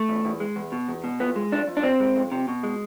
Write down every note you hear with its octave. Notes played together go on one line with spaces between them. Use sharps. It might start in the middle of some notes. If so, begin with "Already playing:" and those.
Already playing: A3
E2
E2
G#3
E2
B2
E2
B2
F2 B3
G#3
F2 D4
F2
D4
C3 C4
G#3
F2
C3
B2
G#3